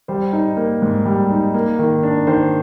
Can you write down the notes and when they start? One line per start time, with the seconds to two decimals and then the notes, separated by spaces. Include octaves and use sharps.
0.08 G3 C5
0.33 D#4
0.57 A#3
0.82 G#2
1.05 G3
1.31 D#4
1.54 A#3
1.79 D#3
2.03 D4
2.27 D#3 C5